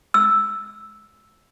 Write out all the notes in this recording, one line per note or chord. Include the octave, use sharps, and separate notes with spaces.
E6